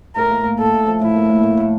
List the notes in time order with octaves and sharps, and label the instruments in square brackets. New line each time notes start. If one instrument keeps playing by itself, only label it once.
[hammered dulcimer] A2 [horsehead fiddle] A#4
[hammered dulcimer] A#3
A2
[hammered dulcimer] A2 [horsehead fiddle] A4
[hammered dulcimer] A2
F3
[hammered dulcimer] A2 [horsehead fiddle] E4
[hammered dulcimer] A#3
A2
A2
A2